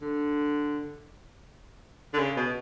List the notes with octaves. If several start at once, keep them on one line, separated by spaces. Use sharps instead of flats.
D3
D3
C#3
B2